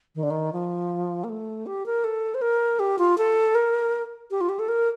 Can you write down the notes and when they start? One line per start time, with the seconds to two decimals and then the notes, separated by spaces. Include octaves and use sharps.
0.15 D#3
0.23 D3
0.30 D#3
0.53 F3
1.24 A#3
1.29 A3
1.66 G4
1.86 A#4
2.04 A4
2.35 C5
2.42 A#4
2.79 G4
2.99 F4
3.18 A4
3.55 A#4
4.31 G4
4.41 F4
4.49 G4
4.59 A4
4.69 A#4